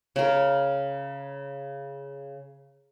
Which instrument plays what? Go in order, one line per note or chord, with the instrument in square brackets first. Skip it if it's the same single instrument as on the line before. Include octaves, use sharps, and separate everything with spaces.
[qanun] C#3 A#4